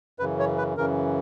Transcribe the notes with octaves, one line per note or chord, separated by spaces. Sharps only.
F#2 C#3 E3 B4
C#5
B4
F#2 C#3 E3 A#4